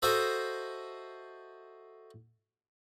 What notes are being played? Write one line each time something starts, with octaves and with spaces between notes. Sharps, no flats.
F#4 A4 C5 D#5 E5